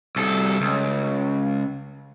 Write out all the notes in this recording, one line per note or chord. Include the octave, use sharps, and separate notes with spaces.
C2 A4
C#2